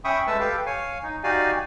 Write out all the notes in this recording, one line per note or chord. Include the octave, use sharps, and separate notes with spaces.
C#4 E5 G5 B5 C#6 D#6
G#3 A3 B4 E5 A5 E6
G4 A4 B4 F5 G5
C#5 F5 G#5
D#4
D#4 F#4 G4 D5 F5 G#5